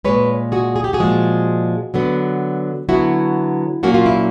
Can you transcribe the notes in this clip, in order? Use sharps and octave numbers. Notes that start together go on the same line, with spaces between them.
A#2 F3 G#3 B4 C#5
F#4 G#4
G#4
G4
F#4 G#4
A#2 F3 G#3
D3 F#3 B3
D3 F#3 B3 E4 F#4
A#2 F#3 A#3 C#4 F#4
F4
E4